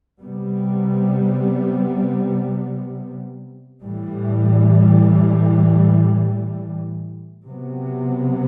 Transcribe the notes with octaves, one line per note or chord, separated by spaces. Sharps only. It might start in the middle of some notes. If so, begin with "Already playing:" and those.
C3 G3 B3
A2 E3 G3
C3 F#3 B3